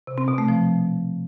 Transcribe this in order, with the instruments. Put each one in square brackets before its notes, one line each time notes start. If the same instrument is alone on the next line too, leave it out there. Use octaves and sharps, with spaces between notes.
[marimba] C3
C4
B2
A3
F3